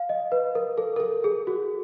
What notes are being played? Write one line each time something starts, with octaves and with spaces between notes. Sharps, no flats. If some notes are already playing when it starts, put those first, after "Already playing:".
Already playing: F5
D#5
B4
A#4
A4
A#4
A4
G#4
F#4